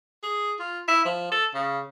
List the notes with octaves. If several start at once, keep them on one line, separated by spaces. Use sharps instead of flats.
G#4
F4
E4
F3
A4
C#3